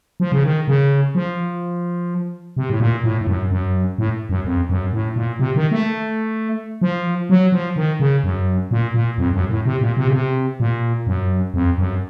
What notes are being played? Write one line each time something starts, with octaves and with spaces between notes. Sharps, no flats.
F3
C#3
D#3
C#3
F3
C3
A2
A#2
A2
A2
F#2
F#2
A2
F#2
F2
F#2
A2
A#2
C3
D#3
A3
F3
F#3
F3
D#3
C#3
F#2
A#2
A#2
F2
F#2
A2
C3
A#2
C3
C#3
C3
A#2
F#2
F2
F#2